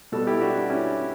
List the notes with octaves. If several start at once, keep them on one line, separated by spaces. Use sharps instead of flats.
B2 G3 B3 F#4 A4
E4 G4
D4 F#4
D4
C#4 E4